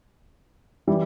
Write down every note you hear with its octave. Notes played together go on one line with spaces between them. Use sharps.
E3 G3